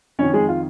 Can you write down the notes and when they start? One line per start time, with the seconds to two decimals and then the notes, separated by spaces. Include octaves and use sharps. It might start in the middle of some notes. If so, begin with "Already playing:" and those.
0.19 F2 D#3 C#4 C#5
0.34 G#3 G#4
0.48 F4